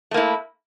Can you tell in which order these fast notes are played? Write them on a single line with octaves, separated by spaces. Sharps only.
A3 A#3 E4